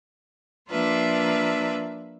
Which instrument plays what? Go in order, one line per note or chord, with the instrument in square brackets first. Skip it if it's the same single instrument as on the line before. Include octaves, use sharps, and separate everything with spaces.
[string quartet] F3 A#3 D4 F4 B4 E5